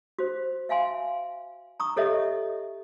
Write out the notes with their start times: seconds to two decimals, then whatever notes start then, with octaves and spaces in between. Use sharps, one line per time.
0.19 F#4 C5
0.69 E5 F5 G#5 C6
1.80 A#5 C#6 D#6
1.96 G4 A4 C#5 D#5 E5